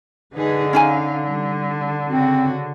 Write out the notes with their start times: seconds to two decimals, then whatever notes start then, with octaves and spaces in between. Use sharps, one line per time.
0.36 D3 D#4 G#4 B4
0.73 C#4 D#4 F5 G#5
1.23 G3
2.09 C#3 C4 F#4